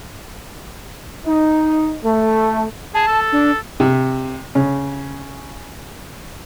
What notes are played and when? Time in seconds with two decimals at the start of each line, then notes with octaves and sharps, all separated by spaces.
1.26 D#4
2.03 A3
2.95 G#4 A5
3.07 A4
3.32 D4
3.80 C3
4.55 C#3